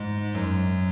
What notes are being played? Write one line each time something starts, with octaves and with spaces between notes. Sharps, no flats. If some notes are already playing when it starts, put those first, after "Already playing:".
Already playing: G#2 G#3
F#2 F#3